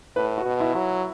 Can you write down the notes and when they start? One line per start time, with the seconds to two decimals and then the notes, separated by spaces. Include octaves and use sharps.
0.16 A2 B4
0.38 F#4
0.45 B2
0.60 E4
0.75 F#3